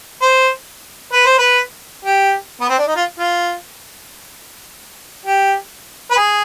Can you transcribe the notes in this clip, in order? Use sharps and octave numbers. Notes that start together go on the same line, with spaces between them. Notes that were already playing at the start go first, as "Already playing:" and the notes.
C5
B4
C5
B4
G4
B3
C4
D4
D#4
F4
F4
G4
B4
G#4